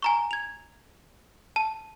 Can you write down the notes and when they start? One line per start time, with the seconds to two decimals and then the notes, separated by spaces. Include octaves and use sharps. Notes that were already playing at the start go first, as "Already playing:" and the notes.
0.02 G#5 A#5 C#6
0.31 G#6 F7
1.56 A5